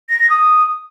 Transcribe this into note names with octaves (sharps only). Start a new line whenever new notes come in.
A#6
A#6
D#6